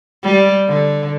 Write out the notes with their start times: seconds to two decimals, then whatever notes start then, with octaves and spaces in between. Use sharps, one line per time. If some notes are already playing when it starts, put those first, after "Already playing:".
0.24 G3
0.68 D3